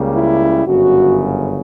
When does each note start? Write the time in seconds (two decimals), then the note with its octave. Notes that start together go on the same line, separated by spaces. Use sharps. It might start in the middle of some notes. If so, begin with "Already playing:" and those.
Already playing: C#2 C#3 G3 A#3
0.10 E4
0.66 G1 F#2 C#3 F#4